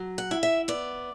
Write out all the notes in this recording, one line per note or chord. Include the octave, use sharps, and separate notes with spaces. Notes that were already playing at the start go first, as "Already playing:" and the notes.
Already playing: F#3
F#5
E4
E5
B3 D5